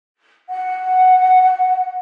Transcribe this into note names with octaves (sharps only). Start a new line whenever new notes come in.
F#5